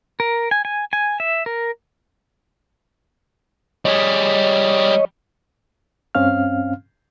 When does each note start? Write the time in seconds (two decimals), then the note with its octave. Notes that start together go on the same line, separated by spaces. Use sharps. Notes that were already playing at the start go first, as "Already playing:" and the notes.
0.20 A#4
0.51 G#5
0.65 G#5
0.93 G#5
1.20 E5
1.46 A#4
3.85 G3 G#4 C#5 D#5
6.15 G2 C4 C#4 F5 F6